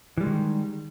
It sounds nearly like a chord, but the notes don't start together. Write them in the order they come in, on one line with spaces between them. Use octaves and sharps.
E3 G3 G#3 D#3